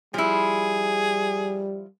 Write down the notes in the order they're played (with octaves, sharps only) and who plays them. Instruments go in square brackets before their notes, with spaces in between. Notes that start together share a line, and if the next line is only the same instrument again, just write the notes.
[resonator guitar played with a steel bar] F3 E4 [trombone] G3 [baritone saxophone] G#4